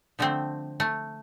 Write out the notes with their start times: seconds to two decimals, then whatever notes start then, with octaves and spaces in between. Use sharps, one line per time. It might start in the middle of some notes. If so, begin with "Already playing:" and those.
0.19 D3 F3 A3 C4
0.80 A3